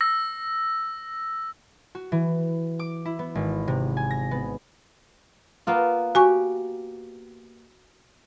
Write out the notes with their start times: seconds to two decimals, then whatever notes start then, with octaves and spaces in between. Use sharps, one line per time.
0.01 E6 A#6
1.95 F#4
2.12 E3
2.79 D6
3.06 E4
3.19 B3
3.35 G#1
3.68 C3
3.97 G#5
4.11 A#6
4.31 B3
5.67 A#3 B3 F4
6.15 F#4 G4 G#5 C#6